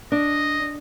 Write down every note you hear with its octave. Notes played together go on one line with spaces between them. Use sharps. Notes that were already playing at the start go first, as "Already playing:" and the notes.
D4 D#5